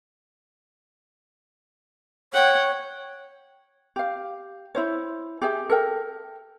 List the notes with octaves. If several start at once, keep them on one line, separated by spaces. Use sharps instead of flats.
C#5 F#5 G5
G4 F5
E4 C5 C#5
G4 G#4 E5
A4 A#4 G5